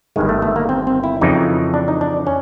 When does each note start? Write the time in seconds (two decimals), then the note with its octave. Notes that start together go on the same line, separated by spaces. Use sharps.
0.16 G1 G2 D#3 G#3
0.29 A3
0.42 A3
0.56 A#3
0.69 C4
0.87 C4
1.04 E4
1.21 F2 C#3 E3 D#4
1.74 D4
1.88 D#4
2.01 D4
2.27 C#4